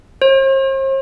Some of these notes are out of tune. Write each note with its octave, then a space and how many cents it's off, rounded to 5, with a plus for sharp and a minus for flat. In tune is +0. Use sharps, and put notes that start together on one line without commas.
C5 +45